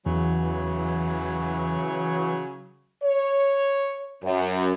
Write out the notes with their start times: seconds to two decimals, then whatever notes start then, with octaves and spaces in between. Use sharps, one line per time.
0.06 E2 C#3 E3 F#3
3.03 C#5
4.23 F#2